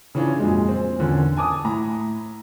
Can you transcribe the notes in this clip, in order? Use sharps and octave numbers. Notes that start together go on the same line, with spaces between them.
C#3 E3 C#4 D4 F4
F2 A#2 F#3 G#3
C4
E2 A#2 D3 A#3 C#4
G#5 A5 D6 D#6
A2 A#5